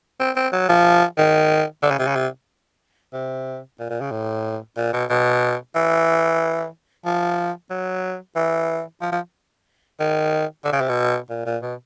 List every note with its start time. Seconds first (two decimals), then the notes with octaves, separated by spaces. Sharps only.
0.20 C4
0.36 C4
0.52 F#3
0.69 F3
1.18 D#3
1.83 D3
1.91 C#3
1.99 C3
2.07 C#3
2.16 C3
3.13 C3
3.79 A#2
3.90 A#2
4.01 C#3
4.11 A2
4.77 A#2
4.93 B2
5.10 B2
5.75 E3
7.05 F3
7.70 F#3
8.36 E3
9.01 F3
9.12 F3
10.00 D#3
10.65 D3
10.73 C#3
10.81 C3
10.89 B2
11.30 A#2
11.46 A#2
11.62 B2